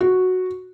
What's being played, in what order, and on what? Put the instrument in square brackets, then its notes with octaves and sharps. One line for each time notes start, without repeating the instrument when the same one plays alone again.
[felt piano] F#4